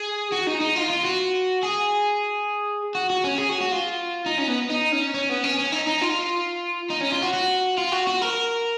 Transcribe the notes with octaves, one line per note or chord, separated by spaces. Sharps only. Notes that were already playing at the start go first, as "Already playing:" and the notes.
Already playing: G#4
F#4
D#4
D#4
F4
F4
F#4
G#4
F#4
F#4
C#4
G#4
F#4
F#4
F4
D#4
C#4
B3
D#4
C#4
C#4
B3
C#4
C#4
D#4
D#4
F4
D#4
C#4
F4
F#4
F#4
F4
F#4
F#4
A#4